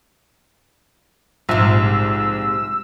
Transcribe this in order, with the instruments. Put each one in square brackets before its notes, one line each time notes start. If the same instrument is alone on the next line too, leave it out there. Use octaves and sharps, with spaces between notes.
[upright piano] A#1 [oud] G#2 C3 [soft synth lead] E6